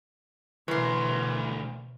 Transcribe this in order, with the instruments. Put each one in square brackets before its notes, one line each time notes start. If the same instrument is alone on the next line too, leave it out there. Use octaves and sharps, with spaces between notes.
[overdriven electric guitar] D2 A#4 [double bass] B2 [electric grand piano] E3 [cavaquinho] C#5 C6